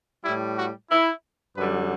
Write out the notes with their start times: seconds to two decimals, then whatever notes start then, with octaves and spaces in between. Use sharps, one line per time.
0.24 A2 G3 E4
0.58 F#4
0.91 E4
1.57 F#2 D3 G3 B4